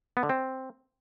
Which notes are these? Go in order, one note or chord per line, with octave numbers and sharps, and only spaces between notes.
B3
D3
C4